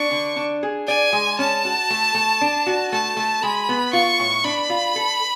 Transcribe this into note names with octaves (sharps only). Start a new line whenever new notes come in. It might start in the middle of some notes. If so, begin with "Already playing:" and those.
Already playing: D4 C#6
D3
D4
G#4
D5 G#5
G#3
C#4 A5
F#4
A3
A3
D4
F#4
A3 A5
A3
G#3 B5
B3
F4 C#6
A2
D4 B5
F4
A4